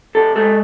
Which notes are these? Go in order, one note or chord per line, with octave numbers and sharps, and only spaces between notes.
C3 A4
G#3 A4